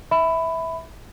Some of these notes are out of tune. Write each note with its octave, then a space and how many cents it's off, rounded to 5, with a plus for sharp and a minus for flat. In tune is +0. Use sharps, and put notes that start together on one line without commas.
E5 -15 B5 +15